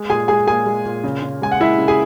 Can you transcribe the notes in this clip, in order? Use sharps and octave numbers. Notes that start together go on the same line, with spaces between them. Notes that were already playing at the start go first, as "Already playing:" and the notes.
Already playing: G#3
A#2 G#4 G#5
G#3 G#4 G#5
A#2 G#4 G#5
G#3
A#2
C#3
C#3
G#3 G#5
F#5
G#3 E4 E5
C#3
G#4 G#5